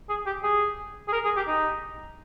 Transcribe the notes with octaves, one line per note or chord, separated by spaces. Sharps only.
G#4
G4
G#4
G#4
A#4
G#4
G4
D#4